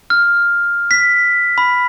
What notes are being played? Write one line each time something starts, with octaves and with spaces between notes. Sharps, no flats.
F6
B6
B5